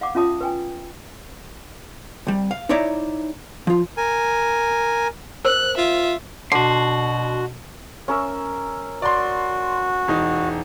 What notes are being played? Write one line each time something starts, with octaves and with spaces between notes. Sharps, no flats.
F5 F#5 D6
C#4 F4 E5 A5 D#6
B4 G5 G#5
C2 G3
F5
D#4 E4 C#5 D5 E5 A#5
F3 F4
A#4 G#5
A#4 C5 F#6
F4 E5
B2 D3 F#4 C6
C#4 A#4 E5
F#4 D5 C6
E1 D#4